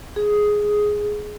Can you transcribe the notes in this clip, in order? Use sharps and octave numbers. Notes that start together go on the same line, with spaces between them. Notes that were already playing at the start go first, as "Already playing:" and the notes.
G#4